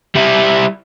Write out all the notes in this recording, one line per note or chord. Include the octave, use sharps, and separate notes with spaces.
G3 E4